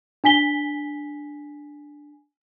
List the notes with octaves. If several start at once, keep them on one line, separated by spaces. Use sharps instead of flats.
D4 G#5 B6 G7